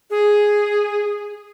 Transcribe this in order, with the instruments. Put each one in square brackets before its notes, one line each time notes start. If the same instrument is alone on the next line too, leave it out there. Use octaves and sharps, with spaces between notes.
[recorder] G#4